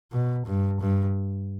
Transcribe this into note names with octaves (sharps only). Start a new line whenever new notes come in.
B2
G2
G2